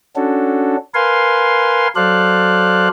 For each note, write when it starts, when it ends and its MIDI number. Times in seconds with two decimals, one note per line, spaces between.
0.16 0.76 61
0.16 0.76 62
0.16 0.76 66
0.16 0.76 69
0.94 1.88 70
0.94 1.88 71
0.94 1.88 77
0.94 1.88 80
0.94 1.88 84
1.96 2.88 54
1.96 2.88 69
1.96 2.88 72
1.96 2.88 74
1.96 2.88 77
1.96 2.88 90